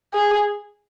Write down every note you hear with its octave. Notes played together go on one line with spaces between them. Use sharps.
G#4